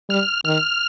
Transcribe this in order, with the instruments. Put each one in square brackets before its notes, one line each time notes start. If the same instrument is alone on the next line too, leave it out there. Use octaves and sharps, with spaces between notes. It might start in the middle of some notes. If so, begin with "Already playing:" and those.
[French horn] G3 [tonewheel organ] F6
[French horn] D#3 [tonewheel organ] F6